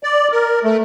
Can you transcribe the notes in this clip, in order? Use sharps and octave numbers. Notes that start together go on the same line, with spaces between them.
D5
A#4
A3